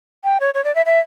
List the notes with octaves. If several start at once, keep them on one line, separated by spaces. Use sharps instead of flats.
G5
C#5
C#5
D5
E5
E5